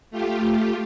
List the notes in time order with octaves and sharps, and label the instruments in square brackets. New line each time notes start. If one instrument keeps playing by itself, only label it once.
[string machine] A3 F4 G4